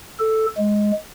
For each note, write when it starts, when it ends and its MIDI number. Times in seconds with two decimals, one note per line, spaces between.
0.20 0.46 69
0.58 0.92 56